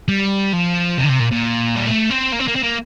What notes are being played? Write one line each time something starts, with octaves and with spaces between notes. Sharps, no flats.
G3
F3
C3
D3
C3
A#2
A#2
G3
A3
C4
A#3
C4
A#3
C4
A#3